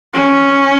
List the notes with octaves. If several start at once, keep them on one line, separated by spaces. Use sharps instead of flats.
C#4